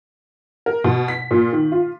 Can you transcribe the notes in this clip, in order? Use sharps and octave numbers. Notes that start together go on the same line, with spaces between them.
A#4
B2
B6
A#2
D#3
F4